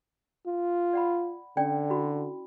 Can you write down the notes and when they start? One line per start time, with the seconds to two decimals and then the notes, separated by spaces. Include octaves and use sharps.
0.47 F4
0.93 D5 F#5 B5
1.57 D3 C#4 D5 G5
1.90 E4 F#4 B5